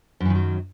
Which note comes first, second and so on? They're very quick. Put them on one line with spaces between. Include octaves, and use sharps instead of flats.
F#2 E3 D#3 F#3